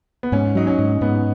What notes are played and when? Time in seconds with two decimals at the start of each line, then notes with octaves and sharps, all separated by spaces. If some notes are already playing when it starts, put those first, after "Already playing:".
0.23 B3
0.32 G#2 C#4
0.55 F#3 D#4
0.67 C#4
0.79 G#2
1.01 G#2 B3